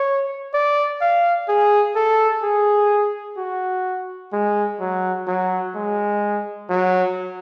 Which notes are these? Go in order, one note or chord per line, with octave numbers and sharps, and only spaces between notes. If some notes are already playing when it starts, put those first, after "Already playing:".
Already playing: C#5
D5
F5
G#4
A4
G#4
F#4
G#3
F#3
F#3
G#3
F#3